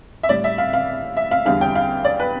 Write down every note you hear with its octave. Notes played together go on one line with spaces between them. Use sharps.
E5
A2 G3 D5
E5
F5
F5
E5
F5
E2 D3 G3 F5
G5
F5
D5
B4